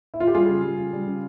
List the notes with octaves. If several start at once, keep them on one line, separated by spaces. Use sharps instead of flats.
E4
F4
G4
G3 F4 G#4
C#3
G3
C#3
G3
C#3